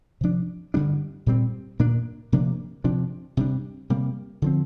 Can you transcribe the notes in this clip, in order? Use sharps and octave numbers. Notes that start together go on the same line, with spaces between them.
C3 F3 D4
G2 D3 G3 D4
A#2 G3 C4
A#2 A#3 D4
C3 F3 A#3 D4
C3 F3 D4
C3 G3 D4
C3 G3 A#3
D3 F3 C4